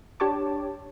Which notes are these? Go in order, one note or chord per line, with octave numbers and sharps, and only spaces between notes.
D4 G4 C#5 A5 D6